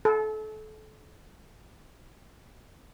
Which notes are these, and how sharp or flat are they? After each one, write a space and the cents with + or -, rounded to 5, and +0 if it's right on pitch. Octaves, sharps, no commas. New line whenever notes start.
A4 -30